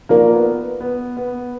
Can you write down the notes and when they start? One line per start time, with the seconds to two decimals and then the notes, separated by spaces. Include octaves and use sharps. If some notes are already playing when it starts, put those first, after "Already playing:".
0.09 A#3 F4 A#4 D5
0.34 B3
0.80 B3
1.17 B3